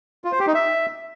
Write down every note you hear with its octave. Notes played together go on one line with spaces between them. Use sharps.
F4
C5
G4
D#4
E5